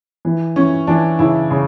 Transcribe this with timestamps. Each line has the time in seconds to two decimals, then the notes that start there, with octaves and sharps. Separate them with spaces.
0.25 E3
0.56 E3 C#4
0.87 E3 D4
1.19 C#3 E4
1.51 C#3